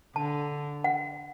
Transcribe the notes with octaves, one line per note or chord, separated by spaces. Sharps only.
D3 A5
F#5